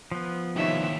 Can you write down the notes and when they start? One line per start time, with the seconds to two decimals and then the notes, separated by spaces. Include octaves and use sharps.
0.11 F3 B3
0.56 D#2 A2 C3 D#4 C#5 E5